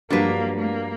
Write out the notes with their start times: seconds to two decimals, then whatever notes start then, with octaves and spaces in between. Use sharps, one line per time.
0.10 G2 F3 F#3 A#3 D4 B4
0.59 A#3